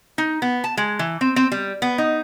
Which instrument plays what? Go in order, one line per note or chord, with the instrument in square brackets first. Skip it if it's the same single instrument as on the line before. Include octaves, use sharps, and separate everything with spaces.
[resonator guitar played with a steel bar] D#4
B3
A5
G#3
E3
C4
C4
G3
B3
D#4